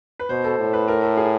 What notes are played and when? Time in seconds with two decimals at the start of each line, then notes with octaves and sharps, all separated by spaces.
0.19 B4
0.29 B2 C5
0.44 A4
0.59 A2
0.73 B4
0.88 A#4
1.02 A4
1.17 G#4